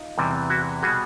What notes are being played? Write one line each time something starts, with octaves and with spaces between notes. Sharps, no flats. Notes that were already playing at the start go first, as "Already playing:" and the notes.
Already playing: D#4 F4
E2 C3 E3 G3
E4 F#4
B2 G3 F#4 G#4